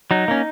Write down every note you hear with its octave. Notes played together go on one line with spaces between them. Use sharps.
F#3 D#4
A#3 C#4